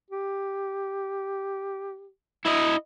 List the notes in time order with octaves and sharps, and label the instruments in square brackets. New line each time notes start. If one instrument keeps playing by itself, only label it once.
[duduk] G4
[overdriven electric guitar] E4 D#5